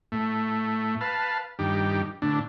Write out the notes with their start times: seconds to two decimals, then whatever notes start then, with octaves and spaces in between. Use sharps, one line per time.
0.12 A2 A3
1.01 B4 F5 A5
1.59 G2 D#3 G4
2.22 A2 D3 D4